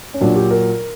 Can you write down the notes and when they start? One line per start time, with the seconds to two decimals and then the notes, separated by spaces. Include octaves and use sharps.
0.14 C#4
0.21 A#2 F#3 D4
0.36 G4
0.51 A#4